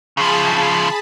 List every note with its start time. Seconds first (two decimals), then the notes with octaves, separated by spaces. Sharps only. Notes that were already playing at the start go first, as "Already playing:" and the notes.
0.17 C#3 F3 G#4 A5 B5